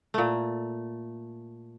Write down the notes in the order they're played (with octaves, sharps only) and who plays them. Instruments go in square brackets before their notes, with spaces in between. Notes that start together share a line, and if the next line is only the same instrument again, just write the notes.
[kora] A#2 A3